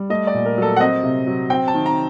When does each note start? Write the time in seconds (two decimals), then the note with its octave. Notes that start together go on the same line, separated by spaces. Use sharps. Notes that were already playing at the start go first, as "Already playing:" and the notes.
Already playing: G3
0.10 A3 D#5
0.27 D5
0.34 A#2
0.46 A#4
0.58 F#3 A4
0.76 F#5
0.80 C4 D#5
1.03 C3
1.27 F#3
1.50 C4 G5
1.68 A5
1.74 D#3
1.86 A#5